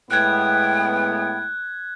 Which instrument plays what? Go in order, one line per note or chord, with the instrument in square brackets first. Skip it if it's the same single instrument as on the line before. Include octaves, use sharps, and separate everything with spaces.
[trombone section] A2 G#3 B3 [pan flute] G5 [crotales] F#6 G#6